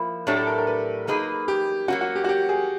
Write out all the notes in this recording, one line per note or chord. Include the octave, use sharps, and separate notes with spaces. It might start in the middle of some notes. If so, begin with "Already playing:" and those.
Already playing: F3 A#3 E4
A2 F#3 A3 D4 G4 C#5
A4
A#4
A#4
B4
F#3 A#3 D#4 G#4 B4
G4
F#3 A#3 C#4 F#4
F#4
G4
F#4
G4
G#4